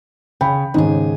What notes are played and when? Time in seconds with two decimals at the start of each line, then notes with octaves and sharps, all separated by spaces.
0.41 C#3 G5 B5
0.74 D#2 G#2 C#3 G#4